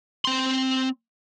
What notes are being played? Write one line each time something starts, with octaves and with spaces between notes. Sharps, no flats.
C4 C6